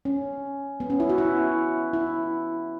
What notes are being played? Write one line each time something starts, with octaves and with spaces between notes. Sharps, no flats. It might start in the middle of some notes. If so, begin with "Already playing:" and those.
C#4
B3
C#4
E4
F#4
E4
E4